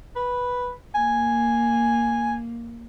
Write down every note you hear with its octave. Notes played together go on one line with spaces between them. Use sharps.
B4
A#3 G#5